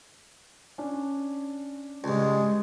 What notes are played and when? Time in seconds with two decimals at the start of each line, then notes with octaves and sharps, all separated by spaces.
0.78 C#4 D4
2.04 C#2 G2 G#3